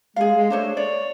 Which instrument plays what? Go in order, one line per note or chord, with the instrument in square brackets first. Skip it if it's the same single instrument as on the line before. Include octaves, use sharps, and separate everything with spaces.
[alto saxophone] G#3 [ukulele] G#4 F5
[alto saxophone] G#3
[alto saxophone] A3 [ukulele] D4 C5 C#5
[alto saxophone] C#5 [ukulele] D5